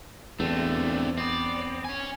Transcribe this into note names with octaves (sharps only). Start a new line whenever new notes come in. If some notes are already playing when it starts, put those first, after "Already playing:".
E2 D3 A3 C4
B3 C4 D5
C#5 G#5